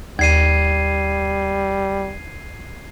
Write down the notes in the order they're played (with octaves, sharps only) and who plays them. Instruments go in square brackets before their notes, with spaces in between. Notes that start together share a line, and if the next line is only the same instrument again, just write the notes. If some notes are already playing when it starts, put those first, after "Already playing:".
[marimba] D#2 D5 [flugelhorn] G3 [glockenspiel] G#6 C7 D#7